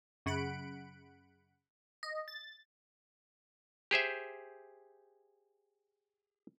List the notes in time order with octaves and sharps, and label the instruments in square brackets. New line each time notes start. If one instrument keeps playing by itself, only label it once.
[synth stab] F#2 C#3 F#5 B5 D7
D#5
A6
[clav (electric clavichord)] G4 G#4 C5 E5